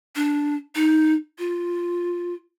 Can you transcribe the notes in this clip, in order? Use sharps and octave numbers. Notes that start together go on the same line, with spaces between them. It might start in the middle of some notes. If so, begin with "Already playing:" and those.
D4
D#4
F4